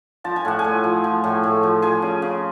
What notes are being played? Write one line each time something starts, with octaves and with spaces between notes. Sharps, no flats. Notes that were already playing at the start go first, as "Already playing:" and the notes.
F3 A5
G#5
A2 F#5
G#4 G#5
A2
F3
F3
A2
A2
F3
F3 G#4 G#5
C#3
C#3